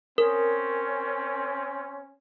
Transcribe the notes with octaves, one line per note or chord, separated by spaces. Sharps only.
C4 C#4 A#4